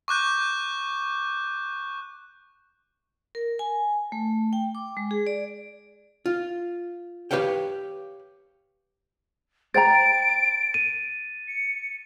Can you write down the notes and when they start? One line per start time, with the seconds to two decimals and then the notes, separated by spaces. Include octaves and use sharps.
0.08 C#6 D6 F#6 G6
3.35 A#4
3.59 G#5
4.12 A3
4.53 G5
4.75 D6
4.97 G#3
5.11 G#4
5.27 D5
6.26 F4
7.31 G4 B4 C#5 F5 G5
9.74 C5 G5 A#5 A6 D7
10.74 D#7
11.48 C#7